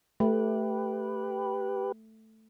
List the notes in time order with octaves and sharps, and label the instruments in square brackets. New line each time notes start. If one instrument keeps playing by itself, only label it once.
[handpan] A3 [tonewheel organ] G4 B4